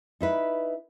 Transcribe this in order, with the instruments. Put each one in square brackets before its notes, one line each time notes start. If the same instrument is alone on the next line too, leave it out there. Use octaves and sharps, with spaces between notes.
[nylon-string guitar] D#4 E4 B4